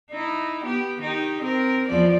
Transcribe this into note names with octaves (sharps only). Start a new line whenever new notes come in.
D#4 E4
B3 G4
D#3 D#4 G4
C4 A#4
E2 F3 D5